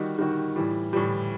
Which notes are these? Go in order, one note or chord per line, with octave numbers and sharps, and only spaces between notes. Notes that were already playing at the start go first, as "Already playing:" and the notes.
Already playing: D#3 G3 D#4 F#4
D#3 G3 D#4 F#4
A2 E3 G3
A2 E3 G3